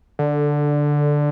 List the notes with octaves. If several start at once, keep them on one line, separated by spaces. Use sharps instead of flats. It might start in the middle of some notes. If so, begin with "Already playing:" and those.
D3